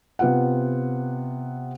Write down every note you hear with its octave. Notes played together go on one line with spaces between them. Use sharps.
C3 B3 F4 F#5